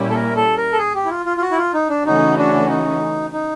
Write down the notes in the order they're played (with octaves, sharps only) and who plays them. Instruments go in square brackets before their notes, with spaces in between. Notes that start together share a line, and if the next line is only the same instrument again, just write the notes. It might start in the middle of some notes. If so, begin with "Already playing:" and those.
Already playing: [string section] A#2 G3 A#3 C#4 E4
[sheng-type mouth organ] A4
A#4
A4
A#4
A4
G#4
G4
E4
F4
F4
F4
F#4
E4
F4
D#4
D4
[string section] C#3 E3 A3 C#4 F#4 [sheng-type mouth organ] D#4
[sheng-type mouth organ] D4
D#4
D#4